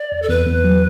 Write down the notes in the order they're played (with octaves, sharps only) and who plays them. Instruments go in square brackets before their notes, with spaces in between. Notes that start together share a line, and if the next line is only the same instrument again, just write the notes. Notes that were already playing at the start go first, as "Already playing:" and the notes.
Already playing: [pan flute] D5
[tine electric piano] E2
[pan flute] A4
[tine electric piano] E2 [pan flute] B4
[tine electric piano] E2
F#3